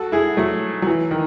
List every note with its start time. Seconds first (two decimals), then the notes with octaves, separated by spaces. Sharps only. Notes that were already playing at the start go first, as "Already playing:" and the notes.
Already playing: F#4 A4
0.12 E4 G#4
0.37 F#3 A3
0.82 F#3
0.87 E3
1.11 D#3